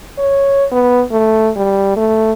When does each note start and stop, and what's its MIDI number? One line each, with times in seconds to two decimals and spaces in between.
0.18 0.65 73
0.72 1.03 59
1.12 1.50 57
1.56 1.95 55
1.96 2.32 57